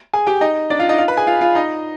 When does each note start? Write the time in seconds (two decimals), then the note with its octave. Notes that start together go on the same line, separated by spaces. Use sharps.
0.13 G#4 G#5
0.27 G4 G5
0.41 D#4 D#5
0.70 D4 D5
0.79 F4 F5
0.89 D#4 D#5
0.98 F4 F5
1.08 B4 B5
1.17 G#4 G#5
1.27 F4 F5
1.41 F4 F5
1.55 D#4 D#5